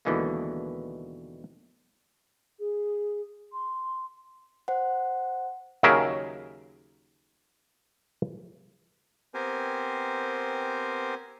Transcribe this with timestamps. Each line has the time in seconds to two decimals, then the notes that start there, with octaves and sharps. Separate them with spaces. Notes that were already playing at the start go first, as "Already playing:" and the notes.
0.05 D#2 B2 D3 E3 G#3 A#3
2.59 G#4
3.52 C6
4.68 C5 F#5
5.83 D#2 C#3 F#3 G#4 A#4 E5
9.34 B3 C4 G4 A#4 C5 G#5